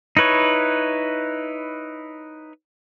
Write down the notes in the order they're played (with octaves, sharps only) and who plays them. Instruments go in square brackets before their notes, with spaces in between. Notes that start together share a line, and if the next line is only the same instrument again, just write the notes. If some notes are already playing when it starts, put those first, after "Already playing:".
[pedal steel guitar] D#4 E4 B4 C#5